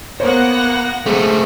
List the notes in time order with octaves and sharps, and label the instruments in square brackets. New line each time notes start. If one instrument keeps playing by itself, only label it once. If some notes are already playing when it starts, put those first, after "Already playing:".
[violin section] A#3 A#6 [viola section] B3 F#5 [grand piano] C5 C#5
[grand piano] G#3 [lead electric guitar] A3 C4